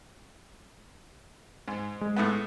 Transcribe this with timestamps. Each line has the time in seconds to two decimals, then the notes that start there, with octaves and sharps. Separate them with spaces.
1.68 G#2
2.01 G#3
2.16 A2 A3 B3